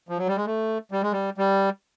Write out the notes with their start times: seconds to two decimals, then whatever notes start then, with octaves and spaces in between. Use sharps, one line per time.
0.09 F3
0.18 F#3
0.27 G3
0.36 G#3
0.46 A3
0.92 G3
1.02 G#3
1.12 G3
1.38 G3